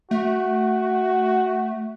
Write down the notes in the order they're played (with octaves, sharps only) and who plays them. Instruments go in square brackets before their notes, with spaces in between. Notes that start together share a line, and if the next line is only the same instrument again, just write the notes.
[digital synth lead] A3 [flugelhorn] F#4